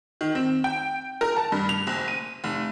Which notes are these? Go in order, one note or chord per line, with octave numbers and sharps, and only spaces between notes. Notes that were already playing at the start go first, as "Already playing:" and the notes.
D#3
C4
G5
A#4
A5
G2
F7
F#1
D#7
F1